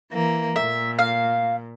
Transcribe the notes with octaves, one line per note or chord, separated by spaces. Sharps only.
E3 A#3
A#2 E5
F5